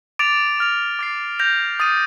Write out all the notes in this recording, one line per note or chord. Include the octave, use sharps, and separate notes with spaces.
D6 A6 D7 F7
D6 F6 A#6 F7
D6 A6 C7
G6 A#6 F7
D#6 A6 D#7